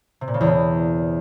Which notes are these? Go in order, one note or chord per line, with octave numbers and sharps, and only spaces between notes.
C3
A#2
C#3
E2
B2